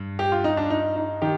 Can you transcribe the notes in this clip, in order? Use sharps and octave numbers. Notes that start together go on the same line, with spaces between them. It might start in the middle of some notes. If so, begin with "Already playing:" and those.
Already playing: G2
G4
F4
D#4
D4
D#4
D#4
D#3 G4